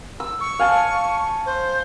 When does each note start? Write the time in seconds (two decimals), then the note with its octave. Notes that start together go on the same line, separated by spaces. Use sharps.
0.20 E6
0.41 C#6
0.59 F5 G#5 A5
1.46 C5